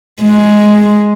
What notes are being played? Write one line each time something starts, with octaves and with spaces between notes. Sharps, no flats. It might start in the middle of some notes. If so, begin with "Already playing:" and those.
G#3